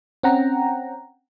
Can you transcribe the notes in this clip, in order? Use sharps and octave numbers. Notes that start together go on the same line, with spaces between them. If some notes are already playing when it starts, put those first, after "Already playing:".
C4 C#4 F#5 G5 A#5